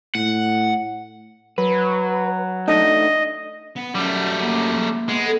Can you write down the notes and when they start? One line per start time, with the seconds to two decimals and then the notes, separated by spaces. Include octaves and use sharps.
0.15 A2 F#5
1.58 F#3 B4
2.68 A3 D4 D#4 D#5
3.76 B3
3.95 F#2 F#3 G3 A3
4.42 A#3
5.09 G#3 B3
5.26 A4